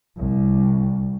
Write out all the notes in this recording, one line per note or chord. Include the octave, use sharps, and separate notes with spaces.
C2